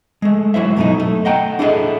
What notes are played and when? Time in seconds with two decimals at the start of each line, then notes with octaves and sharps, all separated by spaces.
0.22 G#3 A3
0.54 F#3 E4 C5 E5
0.76 F#2 B2 F#3 G3 A3 D#4
1.00 A3
1.25 D#5 F#5 G5 A#5
1.59 D4 E4 G#4 A4 C#5 D#5